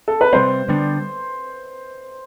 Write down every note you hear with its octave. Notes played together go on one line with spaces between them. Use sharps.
A4
B4
C3 G3 C4 C5
D3 G3 B3 D4